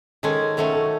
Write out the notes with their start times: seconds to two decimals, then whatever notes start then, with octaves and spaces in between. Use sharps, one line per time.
0.23 D#3 G#3 C#4 A4
0.57 D#3 F#3 A3 C#4 A4
0.74 A4